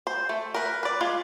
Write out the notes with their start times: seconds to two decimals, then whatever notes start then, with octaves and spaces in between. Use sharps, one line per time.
0.07 C5
0.29 A3
0.54 A#4 B4
0.83 B4 D5
1.01 G#3 F4 F5